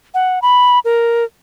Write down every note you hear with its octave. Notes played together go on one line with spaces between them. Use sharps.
F#5
B5
A#4